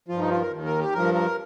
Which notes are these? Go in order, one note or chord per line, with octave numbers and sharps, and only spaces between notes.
G2 F3 F4
D#4
F4
A#4
D#2 D#3
A#4
G4
G2 F3 A#4
A#4